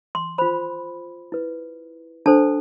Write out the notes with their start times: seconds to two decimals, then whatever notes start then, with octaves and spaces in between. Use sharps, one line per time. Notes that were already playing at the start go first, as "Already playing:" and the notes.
0.15 C6
0.38 F4 C5 B5
1.32 E4 B4
2.26 D4 A4 C5 A5